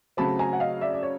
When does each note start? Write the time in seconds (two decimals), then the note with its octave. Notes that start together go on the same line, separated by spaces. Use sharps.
0.17 C#3 F#3 A3 C4 A5 B5
0.39 G#5 A#5
0.53 F#5
0.60 D#5 F5
0.81 D5 E5
0.93 D5
1.03 C#5